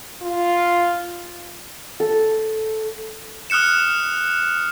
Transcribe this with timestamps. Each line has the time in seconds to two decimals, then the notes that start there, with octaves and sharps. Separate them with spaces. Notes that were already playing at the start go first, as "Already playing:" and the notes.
0.22 F4
2.00 A4
3.50 D#6 F6 F#6 C#7 E7